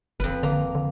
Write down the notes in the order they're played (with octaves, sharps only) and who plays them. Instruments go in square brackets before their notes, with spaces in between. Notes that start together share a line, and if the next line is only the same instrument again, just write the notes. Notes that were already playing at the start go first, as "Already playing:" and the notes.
[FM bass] G1 [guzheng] F2 B4
[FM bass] D3 [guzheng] A#3
[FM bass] D3